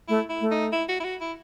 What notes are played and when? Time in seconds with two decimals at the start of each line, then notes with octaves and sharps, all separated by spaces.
0.08 A3 E4
0.30 E4
0.41 A3
0.51 D#4
0.72 E4
0.89 F#4
1.00 E4
1.04 F#4
1.21 E4